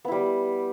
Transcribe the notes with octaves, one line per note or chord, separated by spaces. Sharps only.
G3 B3 E4